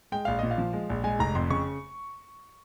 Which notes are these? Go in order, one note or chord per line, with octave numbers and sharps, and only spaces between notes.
G#3 G5
A#1 F5
A#2 D#5
F5
F3
G#3
A#1
G#3 G#5
F1 A#5
F2 C6
C#3 C#6